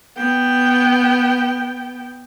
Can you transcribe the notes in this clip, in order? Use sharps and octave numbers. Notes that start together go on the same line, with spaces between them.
B3 G5